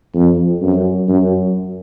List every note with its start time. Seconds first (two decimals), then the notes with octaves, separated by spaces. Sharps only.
0.14 F2
0.62 F#2
1.08 F#2